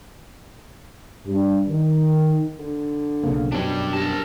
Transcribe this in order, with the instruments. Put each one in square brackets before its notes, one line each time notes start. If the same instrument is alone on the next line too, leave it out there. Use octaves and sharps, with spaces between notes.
[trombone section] G2
D#3
[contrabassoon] D3
[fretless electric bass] B1 C#3 A#3
[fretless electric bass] F#2 B2 F#3 [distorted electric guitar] D4 G4
[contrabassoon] G2 [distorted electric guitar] A#4 A5